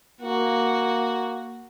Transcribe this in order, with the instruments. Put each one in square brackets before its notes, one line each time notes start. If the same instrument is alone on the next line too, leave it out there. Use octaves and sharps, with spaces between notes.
[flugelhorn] A#3 [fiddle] F#4